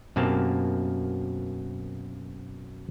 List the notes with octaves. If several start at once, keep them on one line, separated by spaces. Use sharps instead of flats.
F#2 B2 A#3 C4 G4 A5